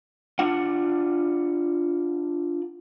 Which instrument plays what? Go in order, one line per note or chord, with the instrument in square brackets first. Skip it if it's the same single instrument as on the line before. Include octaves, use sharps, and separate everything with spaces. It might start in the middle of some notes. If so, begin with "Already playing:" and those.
[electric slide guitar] D4 F4 F#5